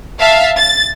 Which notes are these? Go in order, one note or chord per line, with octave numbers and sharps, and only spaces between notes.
E5 F5 A5
A6